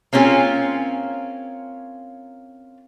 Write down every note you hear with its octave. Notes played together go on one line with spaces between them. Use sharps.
A#3 C4 C#4 F4 G#4